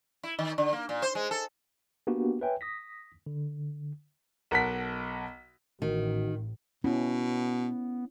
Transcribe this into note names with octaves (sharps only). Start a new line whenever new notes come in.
E4
D#3
D3
A#3
A#2
C5
G#3
A4
A#3 B3 D4 F#4 G4
B4 C#5 E5 G5 G#5
D#6 A#6 B6
D3
B1 A#4 F#5 A5 B6
A1 D#3 F#4
B2 B3 C#4 E4